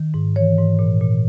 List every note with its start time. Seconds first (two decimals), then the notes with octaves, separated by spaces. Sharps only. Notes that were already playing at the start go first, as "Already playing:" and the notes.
Already playing: D#3
0.14 G#2
0.36 E3 C#5
0.58 G#2
0.79 A#2
1.01 A#2